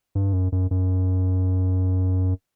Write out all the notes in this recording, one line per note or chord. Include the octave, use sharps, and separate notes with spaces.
G2
F#2
F#2
F#2